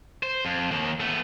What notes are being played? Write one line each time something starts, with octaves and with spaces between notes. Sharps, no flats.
C5
F2
D#2 D#3
A3 B3